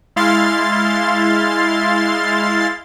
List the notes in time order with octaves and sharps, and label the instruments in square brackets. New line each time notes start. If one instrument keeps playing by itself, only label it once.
[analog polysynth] G#3 E4 F5 C6 A6